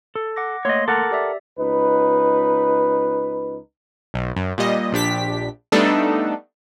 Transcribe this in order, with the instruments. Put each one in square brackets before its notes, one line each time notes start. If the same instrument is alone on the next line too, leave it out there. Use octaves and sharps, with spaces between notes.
[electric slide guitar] A4
[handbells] F#5 D6 A#6
[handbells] A3 A#3 C6 [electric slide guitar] C#5 D#5
[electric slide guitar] A4 A#4 F#5 [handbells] D6
[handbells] G4 D5 E5
[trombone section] C#2 D#4 B4
[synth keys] B1
F#2
A#2 G3 D#5
A#1 D4 G4 B6
G3 A3 B3 D4 D#4 A4